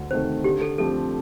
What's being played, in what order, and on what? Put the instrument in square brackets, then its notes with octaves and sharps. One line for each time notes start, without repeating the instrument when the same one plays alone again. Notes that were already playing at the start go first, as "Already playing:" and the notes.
Already playing: [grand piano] D2
[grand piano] C3 D#3 A3 [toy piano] C5
[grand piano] D3 [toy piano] G4
[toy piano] A4
[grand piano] F3 A3 C4 G4 [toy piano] A4